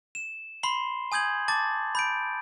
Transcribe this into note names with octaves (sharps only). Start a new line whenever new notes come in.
E7
B5 C6 C7 G7
G#5 D#6 G6 G#6 F#7
A5 D6 A6
B5 G6 D7